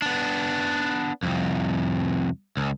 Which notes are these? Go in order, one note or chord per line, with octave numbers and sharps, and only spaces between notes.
B3 D4
C2 F2
C#2